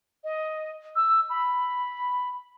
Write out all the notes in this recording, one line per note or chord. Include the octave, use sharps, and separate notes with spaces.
D#5
E6
B5